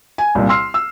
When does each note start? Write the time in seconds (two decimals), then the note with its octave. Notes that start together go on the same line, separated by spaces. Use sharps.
0.18 G#5
0.35 C2 A#2
0.49 C6 E6 F6 C7
0.74 E6